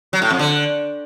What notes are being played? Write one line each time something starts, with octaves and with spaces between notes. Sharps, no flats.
F#3
A2
F2
D3